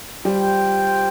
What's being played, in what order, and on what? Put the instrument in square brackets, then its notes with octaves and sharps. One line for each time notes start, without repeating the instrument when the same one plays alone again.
[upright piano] G3 [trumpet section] F4 C5 G5